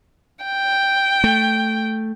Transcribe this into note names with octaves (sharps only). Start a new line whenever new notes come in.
G5
A3